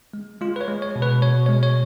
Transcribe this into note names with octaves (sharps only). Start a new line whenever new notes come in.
G#3
G#3 F4
B4
C#5
G#3
C#5
B2
B4
B2 C#5
C#5
G#3
C#5